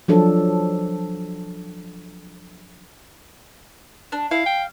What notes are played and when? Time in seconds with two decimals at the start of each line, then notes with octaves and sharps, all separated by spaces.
0.08 F3 F#3 D4 A4
4.12 D4
4.31 E4 F5
4.46 G5